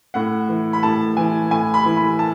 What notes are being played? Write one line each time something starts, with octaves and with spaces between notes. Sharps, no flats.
A2 F#5
E3
B5
A2 A5
E3 G#5
A2 G#5
B5
E3
B5
A5